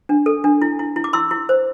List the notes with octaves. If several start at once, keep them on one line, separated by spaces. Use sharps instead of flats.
D4
A4
D4
E4
E4
E4
D6
E4 C6 E6
E4
C5